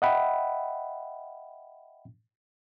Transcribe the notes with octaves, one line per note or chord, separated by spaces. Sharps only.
D#5 E5 F#5 G5 B5